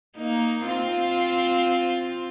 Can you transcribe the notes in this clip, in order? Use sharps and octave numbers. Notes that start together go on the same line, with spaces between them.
A#3 D#4
C4 F4